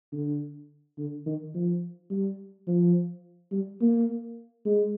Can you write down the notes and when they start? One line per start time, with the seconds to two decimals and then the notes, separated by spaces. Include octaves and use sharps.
0.12 D3
0.98 D3
1.26 D#3
1.55 F3
2.11 G3
2.67 F3
3.52 G3
3.81 A#3
4.66 G#3